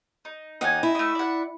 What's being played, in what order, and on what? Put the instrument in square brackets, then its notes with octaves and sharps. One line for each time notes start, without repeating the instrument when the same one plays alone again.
[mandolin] D#4
[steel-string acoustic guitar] D#2 F#5 [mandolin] D#4 G#5
[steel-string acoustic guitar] E4
[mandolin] A3 D#5
D5 F#5